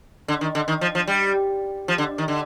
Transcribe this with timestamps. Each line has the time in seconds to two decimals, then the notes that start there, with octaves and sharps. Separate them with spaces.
0.28 D3
0.41 D#3
0.55 D3
0.68 D#3
0.81 F3
0.95 F3
1.08 G3
1.88 F3
1.98 D3
2.18 D#3
2.28 D3